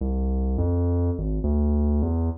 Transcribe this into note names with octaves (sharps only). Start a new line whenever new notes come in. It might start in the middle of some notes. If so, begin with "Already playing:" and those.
C2
F2
G#1
D2
E2